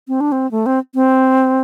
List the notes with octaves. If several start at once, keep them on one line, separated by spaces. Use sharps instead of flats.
C4
D4
C4
A3
C4
C4